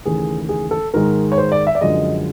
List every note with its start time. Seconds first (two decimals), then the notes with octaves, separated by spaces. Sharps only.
0.05 D#2 C#3 E3 A3 G#4
0.49 G#4
0.71 A4
0.94 G#2 D#3 G#3 A#4
1.32 C#5
1.38 C5
1.52 D5
1.67 E5
1.75 D5
1.81 F#2 D3 F3 G#3 D#5